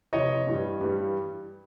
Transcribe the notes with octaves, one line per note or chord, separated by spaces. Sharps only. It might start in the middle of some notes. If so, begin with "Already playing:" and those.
F2 C3 E3 C#5 D#5
G2 E3 G3
G2 E3 G3